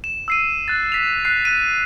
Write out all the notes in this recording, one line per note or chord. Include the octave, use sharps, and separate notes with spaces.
E7
E6 C7 D#7
F#6 A6
B6 F7
F#6 C7
F#6 D#7